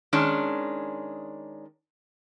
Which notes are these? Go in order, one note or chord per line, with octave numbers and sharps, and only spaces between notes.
D#3 G#3 C#4 D4